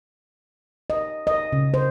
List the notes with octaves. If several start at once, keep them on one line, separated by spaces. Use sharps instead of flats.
D#5
D#5
C#3
C5